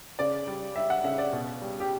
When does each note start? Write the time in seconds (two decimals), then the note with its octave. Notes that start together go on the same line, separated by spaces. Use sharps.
0.19 C#3 D5
0.47 G3
0.76 G3 E5
0.90 F#5
1.04 C#3 E5
1.18 D5
1.33 B2
1.62 G3
1.80 G4